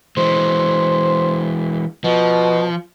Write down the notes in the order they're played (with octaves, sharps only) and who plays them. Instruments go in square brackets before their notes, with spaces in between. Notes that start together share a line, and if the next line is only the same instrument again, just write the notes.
[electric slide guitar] E3 G#3 [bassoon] C5
[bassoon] B2 [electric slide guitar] F3